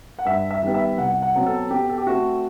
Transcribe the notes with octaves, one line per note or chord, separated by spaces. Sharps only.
F#5
G2 E5
E5
D#3 G3 B3
E5
C2 F#5
F#5
B2 F#3 C4
A4
B2 G4
A4
G4
A3 C4 F#4